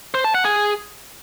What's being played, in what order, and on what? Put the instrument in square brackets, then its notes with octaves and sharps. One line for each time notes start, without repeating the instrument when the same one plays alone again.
[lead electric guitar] C5
A5
F#5
G#4